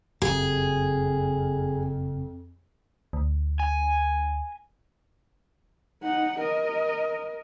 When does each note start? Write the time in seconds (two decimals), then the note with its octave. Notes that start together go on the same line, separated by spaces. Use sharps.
0.22 F#1 F2 G#4
3.13 D2
3.60 G#5
6.02 D#4 F#5
6.40 A#4 D#5